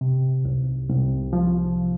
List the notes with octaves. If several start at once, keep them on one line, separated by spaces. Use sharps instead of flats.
C3
C2
C2
F3